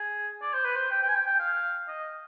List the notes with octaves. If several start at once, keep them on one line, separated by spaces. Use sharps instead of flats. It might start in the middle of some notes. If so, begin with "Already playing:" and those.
Already playing: G#4
D5
C5
B4
C5
G5
G5
G#5
G5
G5
F5
D#5